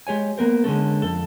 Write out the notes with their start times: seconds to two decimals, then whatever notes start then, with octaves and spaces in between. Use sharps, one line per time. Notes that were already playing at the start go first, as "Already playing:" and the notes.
0.07 G#3 G4 C#5 G#5
0.38 A#3 B3 A#4 C5
0.64 D3 G#3 C#4 A4
1.02 F2 A4